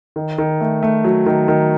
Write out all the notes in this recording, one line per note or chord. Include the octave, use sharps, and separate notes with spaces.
D#3
D#3
A3
A3
F#3
D#3
D#3